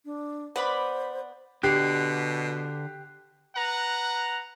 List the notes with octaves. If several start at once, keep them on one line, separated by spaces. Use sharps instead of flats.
D4
B3 B4 C5 D5 B5
B2 D3 G4 F#6 C7
B4 F#5 A#5